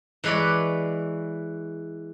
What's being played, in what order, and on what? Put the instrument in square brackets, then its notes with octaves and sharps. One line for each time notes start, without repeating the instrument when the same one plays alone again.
[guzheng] E3 G#3 B4 C#5 D5